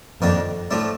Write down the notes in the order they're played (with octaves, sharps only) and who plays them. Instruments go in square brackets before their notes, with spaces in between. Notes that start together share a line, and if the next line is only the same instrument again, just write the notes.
[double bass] F2 [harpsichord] D#3 A#3 D4
[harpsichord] A2 F3 A3 D4